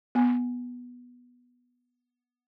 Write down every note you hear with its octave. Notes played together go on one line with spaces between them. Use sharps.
B3 G#5